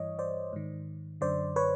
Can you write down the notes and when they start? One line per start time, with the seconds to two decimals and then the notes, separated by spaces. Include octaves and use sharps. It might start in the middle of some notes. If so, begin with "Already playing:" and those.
Already playing: G2 E3 C#5 D#5
0.19 C5 D5
0.53 G#2 D#3
1.21 F#2 D3 C5 D5
1.56 B4 C#5